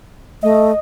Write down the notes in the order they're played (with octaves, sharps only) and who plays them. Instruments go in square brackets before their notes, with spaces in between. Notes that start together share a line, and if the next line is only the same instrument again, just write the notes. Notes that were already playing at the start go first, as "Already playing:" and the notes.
[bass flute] A3 [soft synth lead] D#5